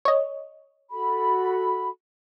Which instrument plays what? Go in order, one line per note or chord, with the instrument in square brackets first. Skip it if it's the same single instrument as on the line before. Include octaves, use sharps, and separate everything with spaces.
[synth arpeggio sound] C#5 D#5
[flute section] F#4 A4 B5